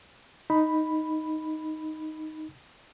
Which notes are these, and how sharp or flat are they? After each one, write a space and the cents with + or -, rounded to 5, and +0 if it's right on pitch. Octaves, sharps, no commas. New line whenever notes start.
D#4 +0 B5 +0